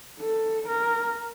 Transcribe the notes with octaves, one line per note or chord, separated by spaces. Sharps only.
A4
A#4